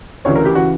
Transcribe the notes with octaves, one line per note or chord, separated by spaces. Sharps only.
D2 C#3 E3 C#5
A#4
G4
C#3 E3 F#4